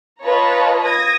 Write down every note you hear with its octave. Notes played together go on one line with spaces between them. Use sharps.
F4 B4 C#5 D#5 A5 A#5
D#6 G#6 A#6